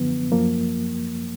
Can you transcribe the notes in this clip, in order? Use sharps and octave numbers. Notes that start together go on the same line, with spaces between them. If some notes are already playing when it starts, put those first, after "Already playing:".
Already playing: F#2 D3 F3 B3
F#2 F3 A#3